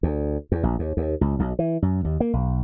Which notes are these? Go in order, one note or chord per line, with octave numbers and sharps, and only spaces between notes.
D2
E2
A#1
D#2
D#2
C#2
B1
E3
F#2
D#2
A#3
B1